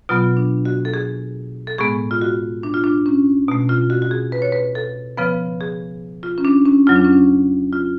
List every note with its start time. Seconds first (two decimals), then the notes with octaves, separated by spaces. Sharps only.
0.09 B2 F#3 B3 F4
0.37 D4
0.65 F#4
0.85 A4
0.94 G#4
1.67 A4
1.78 A2 G#3 B3 G#4
2.11 F4
2.21 F#4
2.63 D4
2.74 F4
2.84 D4
3.06 C#4
3.48 B2 A3
3.69 F4
3.90 F#4
4.02 F#4
4.11 G#4
4.32 B4
4.42 C#5
4.52 B4
4.75 A4
5.17 C#3 F3 B3 B4
5.61 G#4
6.23 F4
6.38 C#4
6.45 D4
6.65 C#4
6.87 F2 C#3 F#3 F4
6.96 D4
7.04 C#4
7.13 D4
7.73 F4